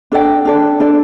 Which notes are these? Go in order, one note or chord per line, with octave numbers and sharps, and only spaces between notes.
D4 A4 D5 G5
D4 A4 D5
D4 A4 D5